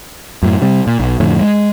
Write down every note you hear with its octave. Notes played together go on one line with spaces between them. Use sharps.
F#2 A2
C3 G3
A#2
B1
F2 A2 D3
G#3